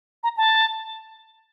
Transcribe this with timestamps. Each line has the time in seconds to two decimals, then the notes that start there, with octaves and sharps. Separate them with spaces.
0.24 A#5
0.37 A5